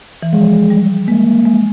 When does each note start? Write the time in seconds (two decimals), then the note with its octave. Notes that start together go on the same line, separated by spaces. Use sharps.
0.23 E3
0.33 F3 G#3
0.70 G3
1.08 G#3 A#3
1.45 G#3